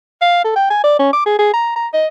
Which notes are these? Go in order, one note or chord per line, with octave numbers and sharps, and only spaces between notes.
F5
A4
G5
G#5
D5
C#4
D6
G#4
G#4
A#5
A#5
D#5